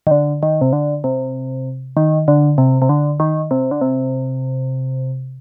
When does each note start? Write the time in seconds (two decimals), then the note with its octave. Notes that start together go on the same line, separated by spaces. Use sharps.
0.07 D#3
0.11 D3
0.43 D#3
0.61 C3
0.73 D3
1.04 C3
1.97 D#3
2.28 D3
2.58 C3
2.82 C3
2.89 D3
3.20 D#3
3.51 C3
3.71 D3
3.81 C3